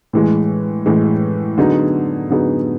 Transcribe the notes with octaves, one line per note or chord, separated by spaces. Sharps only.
A2 E3 G#3
A2 E3 G#3
D3 F#3 B3 D#4 G#4
D3 F#3 B3 D#4 G#4